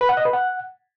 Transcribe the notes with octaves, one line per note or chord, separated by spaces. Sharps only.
B4
F#5
D#5
B4
F#5